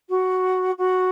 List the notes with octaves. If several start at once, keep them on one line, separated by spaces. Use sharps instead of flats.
F#4
F#4